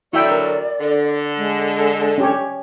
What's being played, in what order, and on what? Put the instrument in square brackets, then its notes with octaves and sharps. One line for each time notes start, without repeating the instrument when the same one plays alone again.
[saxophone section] D3 F#3 [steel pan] E4 E5 G5 [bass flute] D5
[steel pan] A#4
[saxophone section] D3
[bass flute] G#3
[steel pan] C#4 G4 C#5